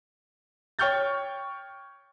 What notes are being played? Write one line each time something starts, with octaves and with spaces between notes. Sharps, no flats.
C#5 G5 C#6 F6 G6 A6